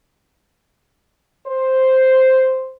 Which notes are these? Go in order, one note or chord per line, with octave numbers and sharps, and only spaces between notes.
C5